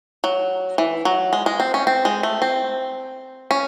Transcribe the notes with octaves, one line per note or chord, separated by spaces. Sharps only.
F#3
E3
F#3
G#3
G#3
C4
C#4
C4
G#3
A3
C4
C#4